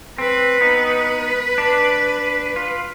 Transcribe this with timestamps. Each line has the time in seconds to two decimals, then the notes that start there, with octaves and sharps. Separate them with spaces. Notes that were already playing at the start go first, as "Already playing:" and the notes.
0.18 C4 B4
0.61 B3 D#4
1.58 D4
2.56 F4